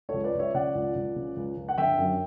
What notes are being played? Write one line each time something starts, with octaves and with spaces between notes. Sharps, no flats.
C#2 A4 C#5
B4 D5
C#2 C#5 E5
C#3 D5 F#5
C#2
C#2
C#3
C#2
C#2
F#5
G1 E5 G5
F#2